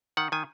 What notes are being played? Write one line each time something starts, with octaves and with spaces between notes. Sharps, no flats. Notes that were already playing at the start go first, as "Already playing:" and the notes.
D#3 F#5
D#3 G#5